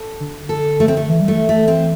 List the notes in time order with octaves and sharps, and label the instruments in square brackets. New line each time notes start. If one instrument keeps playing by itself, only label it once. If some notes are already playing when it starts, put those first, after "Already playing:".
Already playing: [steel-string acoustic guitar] A4
[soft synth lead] D3
[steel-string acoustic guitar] A4
A3
C4
A3
[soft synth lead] E3
G3
[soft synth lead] E3 [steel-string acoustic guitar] A3
[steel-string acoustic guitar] A3
C4